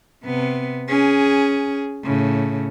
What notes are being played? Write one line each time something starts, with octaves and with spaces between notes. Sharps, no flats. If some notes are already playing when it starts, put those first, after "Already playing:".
C3 B3
C#4 G#4
A2 C#3